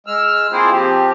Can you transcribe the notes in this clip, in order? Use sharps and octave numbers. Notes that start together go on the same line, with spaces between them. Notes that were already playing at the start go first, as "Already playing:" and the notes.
G#3 E6 F6
A#3 C4 E4 F4 G#4 C5
F3 C4 G4